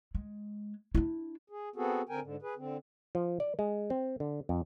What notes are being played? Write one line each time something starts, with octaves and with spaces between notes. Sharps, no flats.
G#3
D4 E4
G#4
B3 C4 F#4 G#4 A4
D3 C4 A#4 G5 G#5
G#2 D3
G#4 B4
D3 C4
F3
D5
G#3
C4
D3
F2